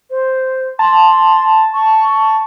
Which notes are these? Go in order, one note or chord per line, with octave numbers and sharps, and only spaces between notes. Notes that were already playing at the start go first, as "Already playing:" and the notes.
C5
A5 C6
C#6